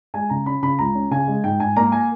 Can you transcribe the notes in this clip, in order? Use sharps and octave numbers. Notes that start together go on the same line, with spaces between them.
G#3 G#5
C#3 A#5
C#4 B5
C#3 B5
C#2 A#5
C#4
C#3 G#5
G#3
G#2 G5
G#2 G#5
A#3 A#5
G#5